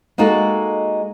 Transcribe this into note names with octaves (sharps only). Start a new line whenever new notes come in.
G#3 A#3 D#4 F#4 A4